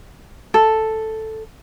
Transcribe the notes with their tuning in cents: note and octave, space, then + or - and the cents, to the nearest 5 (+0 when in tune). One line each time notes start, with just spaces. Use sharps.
A4 +0